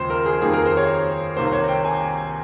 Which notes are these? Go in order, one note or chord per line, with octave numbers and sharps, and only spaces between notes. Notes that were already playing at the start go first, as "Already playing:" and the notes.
Already playing: D#2 C#3 F3 G#3 C5
A#4
G#4
F2 D#3 G3 A#3 G#4
A#4
C5
C#5
C2 C3 D#3 A#3 C5
C#5
G5
G#5